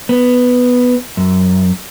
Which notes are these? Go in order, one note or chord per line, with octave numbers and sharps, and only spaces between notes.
B3
F#2